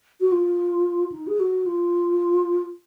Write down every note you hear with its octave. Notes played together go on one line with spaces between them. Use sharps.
F#4
F4
D#4
G#4
F#4
F4